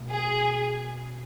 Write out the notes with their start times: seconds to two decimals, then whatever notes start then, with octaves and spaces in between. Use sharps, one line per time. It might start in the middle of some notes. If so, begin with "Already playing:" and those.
Already playing: B2 A3 C#4
0.10 G#4